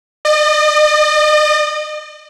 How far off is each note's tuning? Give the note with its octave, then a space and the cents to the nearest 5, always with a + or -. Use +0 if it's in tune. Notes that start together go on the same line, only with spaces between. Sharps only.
D#5 -45